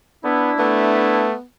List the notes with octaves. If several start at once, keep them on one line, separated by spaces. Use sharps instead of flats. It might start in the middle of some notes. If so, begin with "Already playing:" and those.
B3 D4 E4
A3 B3